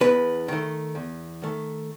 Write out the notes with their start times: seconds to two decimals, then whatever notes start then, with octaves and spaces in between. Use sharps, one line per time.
0.01 E2 B4
0.48 D#3 A3
0.95 E2
1.42 D#3 A3